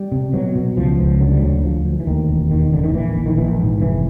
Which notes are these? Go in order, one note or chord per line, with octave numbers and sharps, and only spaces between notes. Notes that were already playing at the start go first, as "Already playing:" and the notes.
Already playing: G3
C3
B2 F#3
B2
C#2 F3
C#2
D3 F#3
G3
D2 F#3
D2 F3
D2
E3
D#2 D#3
E1
D#2 D#3
E1 D3
D#3
A#1 E3
A#1
D#3
A#1 E3
G#2
F1 E3